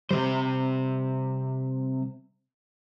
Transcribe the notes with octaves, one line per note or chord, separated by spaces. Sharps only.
C3 G3 C5